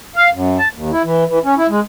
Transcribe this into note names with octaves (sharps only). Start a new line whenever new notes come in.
F5
F#2
A5
D#2
E4
E3
E3
C#4
E4
G#3